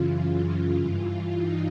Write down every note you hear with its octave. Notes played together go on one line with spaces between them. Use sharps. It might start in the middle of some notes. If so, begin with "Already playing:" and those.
Already playing: F#2 C#3 E3 F4
F4
G2 E3 F4
D#4